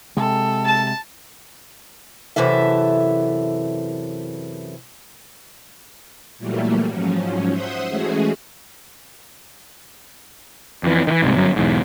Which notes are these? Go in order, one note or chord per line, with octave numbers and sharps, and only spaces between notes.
C3 G#3 A4
A5
F#2 C3 E3 A4 E5
A#2 E3 F#3 G3 A3 A#3
G#2 F3 F#3 C#4
C5 E5 F#5 C6 D#6
E3 G#3 A3 C#4 F#4 G#4
F2 E3
D#3 E3
C2 G#2 C3
G1 F#2 F#3
B1 E2 G#2